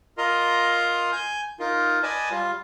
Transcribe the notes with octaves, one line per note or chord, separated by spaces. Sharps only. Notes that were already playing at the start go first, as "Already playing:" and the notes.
F4 A#4 D#5 A#5 C6
G#5 G6
D#4 F4 A#4
B4 D5 D#5 G#5 A5
G3 F4